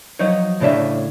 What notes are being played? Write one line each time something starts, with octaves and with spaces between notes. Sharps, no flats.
F3 F#3 D#4 C#5
A2 C#3 D4 E5